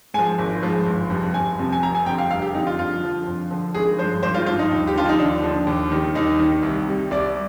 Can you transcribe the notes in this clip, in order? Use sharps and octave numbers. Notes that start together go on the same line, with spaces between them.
G#2 F3 G#5
G#1
G#2 F3
G1
F2 C3 F3
G1 G#5
F2 C3 F3
G#5
F1 A#5
G#5
F2 D3 G3 G5
F5
F1 F5
G4
F2 D3 G3 D#4
F4
F2 F4
D3 F3
F2
D3 F3
G#1 G#4
G2 F3 C5
G#1 C5
F4
G2 F3 F4
D#4
D#2
G4
D3 F3 F4
D#4
D#2 D4
D3 F3
D#2
D#3 G3
D#2 D#4
D#3 G3
C2
C3 G3
C2 D5